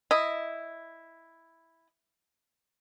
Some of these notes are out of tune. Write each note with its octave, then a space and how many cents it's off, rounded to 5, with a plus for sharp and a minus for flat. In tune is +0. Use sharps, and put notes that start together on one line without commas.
E4 +0 D#5 +0